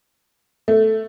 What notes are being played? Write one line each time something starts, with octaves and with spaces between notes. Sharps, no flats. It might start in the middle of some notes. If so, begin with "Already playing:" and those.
A3